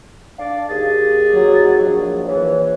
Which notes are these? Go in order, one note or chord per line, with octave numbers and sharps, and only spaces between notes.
D4 D5 F5
D#2 G#4 A6
F#3
A#1
E3 C#5